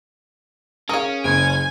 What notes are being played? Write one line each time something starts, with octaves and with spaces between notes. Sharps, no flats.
C#4 G#4 A#4 F5 D#6
F#1 G#5 D7